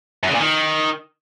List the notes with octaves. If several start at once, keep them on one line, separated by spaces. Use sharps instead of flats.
F#2
C#3
A#2
D#3